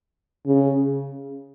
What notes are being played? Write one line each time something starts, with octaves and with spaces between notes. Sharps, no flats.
C#3